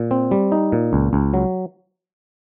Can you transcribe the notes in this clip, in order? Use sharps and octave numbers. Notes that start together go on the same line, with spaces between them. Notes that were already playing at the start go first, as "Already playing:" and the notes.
Already playing: A#2
C4
G3
D#4
A#2
C#2
C#2
F#3